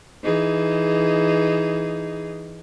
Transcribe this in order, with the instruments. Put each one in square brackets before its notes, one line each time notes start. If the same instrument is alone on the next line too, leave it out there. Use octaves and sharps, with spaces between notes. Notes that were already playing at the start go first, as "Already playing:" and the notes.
[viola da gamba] E3 D#4 G#4